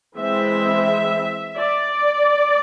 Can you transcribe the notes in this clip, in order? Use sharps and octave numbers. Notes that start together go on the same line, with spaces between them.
E3 G#3 C4 E5
D5